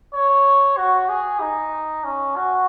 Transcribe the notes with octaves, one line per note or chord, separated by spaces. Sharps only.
C#5
F#4
G#4
D#4
C#4
F#4